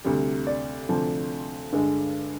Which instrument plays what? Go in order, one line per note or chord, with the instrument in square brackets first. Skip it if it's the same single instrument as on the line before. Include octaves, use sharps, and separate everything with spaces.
[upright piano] D2 C3 G3
D5
D2 C3 F3
G2 D3 G#3